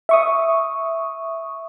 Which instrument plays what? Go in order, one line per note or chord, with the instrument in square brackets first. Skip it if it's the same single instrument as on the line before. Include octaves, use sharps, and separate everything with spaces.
[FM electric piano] E5 C#6 D#6